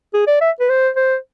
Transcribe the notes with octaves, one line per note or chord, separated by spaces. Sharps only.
G#4
D5
E5
B4
C5
C5